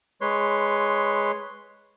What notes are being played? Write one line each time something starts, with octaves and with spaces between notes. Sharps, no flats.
G#3 B4 C#5 C6